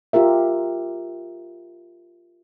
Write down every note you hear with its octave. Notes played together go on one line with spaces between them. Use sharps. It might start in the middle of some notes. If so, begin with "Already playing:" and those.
F4 G4 A#4 E5